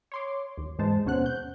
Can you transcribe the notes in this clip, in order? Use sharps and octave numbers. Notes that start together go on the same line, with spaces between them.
C#5 C6 D6
D#2
G#2 E3 G#3 C5 A5
D#2 B2 C#4 C5 F#5 F#6
G6